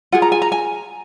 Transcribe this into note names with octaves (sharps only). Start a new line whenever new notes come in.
F4 G#4 F#5
A#5
G#5
A#5
G#5